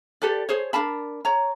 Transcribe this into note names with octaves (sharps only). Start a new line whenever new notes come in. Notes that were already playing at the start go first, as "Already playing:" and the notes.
G4 A4 B4 D5
G#4 C5 C#5
D4 A#4 A5 B5
C#5 A#5